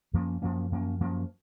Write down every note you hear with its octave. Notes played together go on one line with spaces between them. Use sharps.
F#2 F3 A#3 C#4
F#2 F3 A#3 C#4
F#2 F3 A#3 C#4
F#2 F3 A#3 C#4